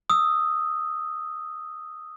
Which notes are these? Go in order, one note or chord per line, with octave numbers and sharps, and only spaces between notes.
D#6 E6